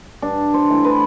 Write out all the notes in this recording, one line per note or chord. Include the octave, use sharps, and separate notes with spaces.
G2 D4
C5
E3 A3
B4